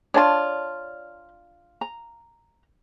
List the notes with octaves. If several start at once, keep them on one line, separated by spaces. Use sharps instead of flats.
D4 F4 C#5 D5 A5
A#5